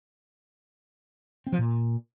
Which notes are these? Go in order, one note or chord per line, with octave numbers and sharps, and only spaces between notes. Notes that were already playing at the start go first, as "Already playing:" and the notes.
C4
F3
A#2